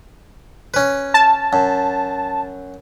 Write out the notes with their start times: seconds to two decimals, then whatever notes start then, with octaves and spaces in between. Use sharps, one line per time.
0.74 C#4 B4
1.14 A5
1.53 F#2